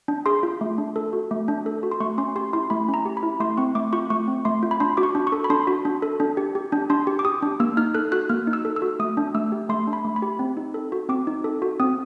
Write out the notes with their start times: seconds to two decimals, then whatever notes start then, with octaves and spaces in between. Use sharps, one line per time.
0.08 D4
0.26 G#4 C6
0.43 F4
0.61 A3
0.78 D4
0.96 A4
1.13 F#4
1.31 A3
1.48 D4
1.66 A4
1.83 F#4
1.91 C6
2.00 A3 C#6
2.18 C#4 C6
2.36 G4 C6
2.53 E4 C6
2.70 A3 B5
2.88 C#4
2.94 A#5
3.06 G4
3.17 B5
3.23 E4
3.40 A3 C6
3.57 C4 C#6
3.75 A3 D6
3.93 F4 C#6
4.10 A3 C#6
4.28 C4
4.45 A3 C6
4.63 F4
4.71 B5
4.80 D4 C6
4.97 F#4 D6
5.03 C#6
5.15 D4
5.27 C#6
5.32 A4
5.44 B5
5.50 D4 C6
5.67 F#4
5.85 D4
6.02 A4
6.20 D4
6.37 G4
6.55 G4
6.72 D4
6.90 D4 C6
7.07 G4
7.19 D6
7.25 G4 D#6
7.42 D4
7.60 A#3 E6
7.77 D#4 F6
7.94 A4 F#6
8.12 F#4 F#6
8.29 A#3 F6
8.47 D#4
8.53 E6
8.65 A4
8.76 E6
8.82 F#4
9.00 A3 D#6
9.17 D4
9.35 A3 E6
9.52 G4
9.69 A3 C6
9.87 D4
9.93 B5
10.05 A3
10.16 B5
10.22 G4
10.39 C4
10.57 D#4
10.74 A4
10.92 F#4
11.09 C4 D6
11.27 D#4
11.44 A4
11.62 F#4
11.80 C4 D#6